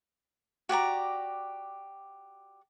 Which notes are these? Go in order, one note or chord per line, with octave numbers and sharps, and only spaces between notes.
F#4 G4 D5 A#5